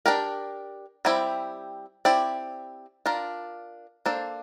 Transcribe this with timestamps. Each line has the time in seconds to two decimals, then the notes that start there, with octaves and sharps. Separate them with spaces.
0.06 D4 G4 A#4
1.05 G3 C4 E4 G4
2.05 C4 E4 G4 D5
3.06 D4 F4 A#4
4.06 A#3 D4 A4 C5